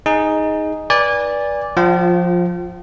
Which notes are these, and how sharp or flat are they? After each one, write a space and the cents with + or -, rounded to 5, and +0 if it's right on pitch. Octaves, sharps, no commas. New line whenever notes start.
D#4 +5 G#4 +0
B4 -25 D5 -10 G#5 -25
F3 +15 F4 +0 G5 -45